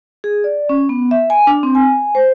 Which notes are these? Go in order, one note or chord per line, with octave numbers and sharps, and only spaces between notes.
G#4
D5
C#4
B3
E5
G#5
D4
C4
G#5
C5